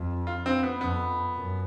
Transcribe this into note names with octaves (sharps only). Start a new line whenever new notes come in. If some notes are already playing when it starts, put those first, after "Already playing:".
Already playing: F2
F4
C4
B3
F2 B3
F#2